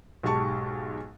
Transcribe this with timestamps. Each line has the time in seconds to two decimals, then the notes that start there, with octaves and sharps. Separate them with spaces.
0.23 B1 G#2 G4 A5 C#6